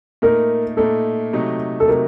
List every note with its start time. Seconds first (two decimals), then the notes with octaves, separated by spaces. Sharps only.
0.22 A#2 A3 D#4 A#4
0.77 A#2 A3 D#4 A4
1.33 C3 F#3 A3 D#4
1.80 A4
1.88 C3 F#3 A3 D#4 A#4